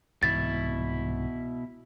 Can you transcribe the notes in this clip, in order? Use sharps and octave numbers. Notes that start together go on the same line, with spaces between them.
C2 G#2 B2 E3 E4 A6